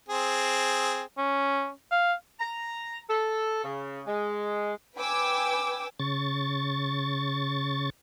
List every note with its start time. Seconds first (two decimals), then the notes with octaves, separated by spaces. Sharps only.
0.09 C4 G#4
1.18 C#4
1.92 F5
2.40 A#5
3.10 A4
3.64 C#3
4.07 G#3
4.97 B4 G5 G#5 D6 E6
6.00 C#3 C#6 A6